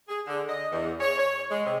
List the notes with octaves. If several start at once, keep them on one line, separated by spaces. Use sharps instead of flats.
G#4
D3
D#5
E2
C#5
C#5
G#3
C3